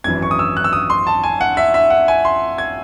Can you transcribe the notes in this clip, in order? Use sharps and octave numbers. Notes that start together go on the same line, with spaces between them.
G#1 F#2 E3 G#6
C#6
D#6
E6
F#6
E6
D#6
C6
A5
G#5
F#5
E5
E5
F#5
G#5
C6
G#6